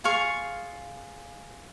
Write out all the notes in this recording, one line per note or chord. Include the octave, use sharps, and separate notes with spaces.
F4 G#4 F5 C#6